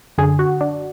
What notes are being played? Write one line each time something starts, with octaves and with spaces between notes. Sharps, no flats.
F#2 D3 G#4
F#4
D4